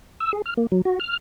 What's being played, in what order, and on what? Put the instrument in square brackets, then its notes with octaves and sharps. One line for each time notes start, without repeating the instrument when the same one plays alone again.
[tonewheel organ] E6
G#4
F6
A#3
F#3
F#4
F6